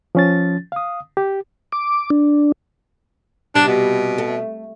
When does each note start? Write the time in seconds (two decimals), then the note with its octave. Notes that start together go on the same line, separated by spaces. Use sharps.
0.15 F3 C#4 A6
0.72 F5 D#6
1.17 G4
1.72 D6
2.10 D4
3.55 C3 G3 B3 D4
3.67 B2
4.18 A3